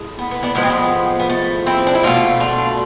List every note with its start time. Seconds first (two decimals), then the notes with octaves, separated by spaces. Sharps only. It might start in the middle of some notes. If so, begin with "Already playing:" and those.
Already playing: A2 G#3
0.19 B3
0.31 B3
0.43 B3 D4
0.55 A2 F3 G#3 B3
0.63 C4
0.70 B3
1.20 B3
1.30 A3
1.66 C4 E4
1.87 D4
1.95 E4
2.03 B2 A3 D4 F4
2.40 D4 F4